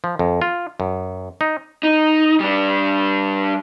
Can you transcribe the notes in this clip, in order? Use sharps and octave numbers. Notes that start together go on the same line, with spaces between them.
F3
F2
F4
F#2
D#4
D#4
G3 D4